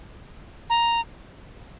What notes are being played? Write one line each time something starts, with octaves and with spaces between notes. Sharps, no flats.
A#5